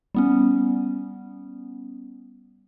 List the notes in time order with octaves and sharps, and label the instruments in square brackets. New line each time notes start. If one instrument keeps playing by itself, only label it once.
[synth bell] G3 B3 C#4